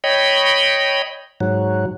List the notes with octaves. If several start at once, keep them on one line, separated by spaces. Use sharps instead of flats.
C#5 D#5 G5 B5
G#2 F#3